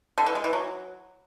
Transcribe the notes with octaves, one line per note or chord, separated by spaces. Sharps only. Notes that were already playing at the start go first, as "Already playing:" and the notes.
D3
E3
G#3
E3
F#3